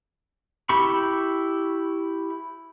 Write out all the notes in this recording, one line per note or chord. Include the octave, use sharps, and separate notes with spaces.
E4 G4 B5 C#6